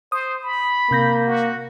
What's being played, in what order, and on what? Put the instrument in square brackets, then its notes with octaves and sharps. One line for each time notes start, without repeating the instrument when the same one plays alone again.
[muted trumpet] C5 [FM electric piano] D#6
[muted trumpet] B5
[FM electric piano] C3 G6 A#6 [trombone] A#3
[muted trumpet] F#4